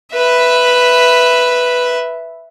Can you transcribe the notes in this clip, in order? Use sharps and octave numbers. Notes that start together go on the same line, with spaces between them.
B4 E5